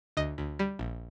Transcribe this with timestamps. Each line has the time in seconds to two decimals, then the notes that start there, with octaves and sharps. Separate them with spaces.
0.17 D2 D#5
0.38 D2
0.59 G3
0.79 A#1